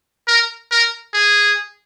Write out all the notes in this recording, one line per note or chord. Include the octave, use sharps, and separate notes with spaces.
A#4
A#4
G#4